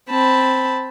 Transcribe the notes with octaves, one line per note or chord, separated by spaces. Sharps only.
C4 A5 B5